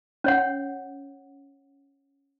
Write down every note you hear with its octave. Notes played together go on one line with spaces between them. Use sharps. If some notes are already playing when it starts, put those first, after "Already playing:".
C#4 C#5 F#5